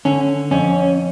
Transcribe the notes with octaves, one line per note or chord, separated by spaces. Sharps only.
D3 C#4
F2 C#4